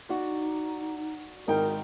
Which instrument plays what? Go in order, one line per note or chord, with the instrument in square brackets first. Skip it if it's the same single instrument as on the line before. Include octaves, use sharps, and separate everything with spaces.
[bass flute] D#4 [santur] F#4 D5
[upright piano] G#1 G5 [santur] D#4 [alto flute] A#4